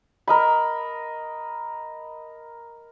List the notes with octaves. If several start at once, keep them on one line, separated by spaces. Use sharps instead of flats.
A#4 D#5 B5